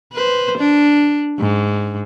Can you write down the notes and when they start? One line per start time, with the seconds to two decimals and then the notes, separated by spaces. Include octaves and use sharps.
0.13 B4 C5
0.58 D4
1.39 G#2